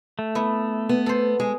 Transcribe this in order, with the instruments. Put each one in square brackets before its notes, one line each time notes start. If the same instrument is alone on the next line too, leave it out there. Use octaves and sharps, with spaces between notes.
[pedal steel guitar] A3
[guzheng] B3 E4
[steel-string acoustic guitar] B3
[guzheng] A4 C5
[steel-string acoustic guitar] G#3 [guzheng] G#4